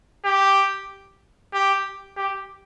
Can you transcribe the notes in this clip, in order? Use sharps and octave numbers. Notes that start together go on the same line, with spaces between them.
G4
G4
G4